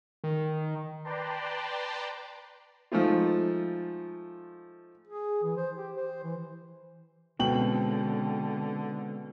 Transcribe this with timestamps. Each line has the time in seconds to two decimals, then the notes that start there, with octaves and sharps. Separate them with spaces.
0.24 D#3
1.04 B4 D5 G5 A5 A#5 C6
2.92 F3 G#3 A3 D#4 F4
5.07 G#4
5.43 E3
5.57 C5
5.76 G4
5.96 C5
6.24 E3
7.40 B2 D3 G#3 C4 C#4 G5 F#7